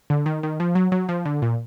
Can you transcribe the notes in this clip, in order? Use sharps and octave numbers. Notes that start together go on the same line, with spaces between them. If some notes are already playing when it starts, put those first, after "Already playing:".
D3
D#3
D#3
F3
F#3
F#3
F3
D3
A#2